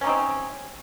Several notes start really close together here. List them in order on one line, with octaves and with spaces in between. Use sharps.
C#4 C3 D#4 C4